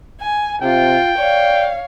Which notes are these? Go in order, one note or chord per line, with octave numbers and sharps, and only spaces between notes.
G#5
C3 F4 G5
C#5 D5 F5